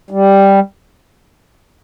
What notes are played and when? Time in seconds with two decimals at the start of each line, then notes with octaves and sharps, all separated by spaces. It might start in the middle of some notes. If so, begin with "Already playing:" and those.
0.11 G3